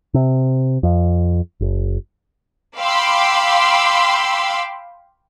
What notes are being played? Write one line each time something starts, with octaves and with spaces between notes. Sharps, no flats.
C3
F2
F#1
F5 G5 B5 C6 D6 E6